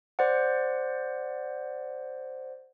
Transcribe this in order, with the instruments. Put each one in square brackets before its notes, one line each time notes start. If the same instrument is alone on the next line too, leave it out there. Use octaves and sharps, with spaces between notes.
[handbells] C5 D5 F#5